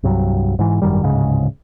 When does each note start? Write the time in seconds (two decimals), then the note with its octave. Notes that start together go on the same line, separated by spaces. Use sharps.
0.03 C2 G2 F#3
0.59 G#2 E3
0.82 G#1 F#2 D#3 G3
1.02 D1 G#2 C#3 G#3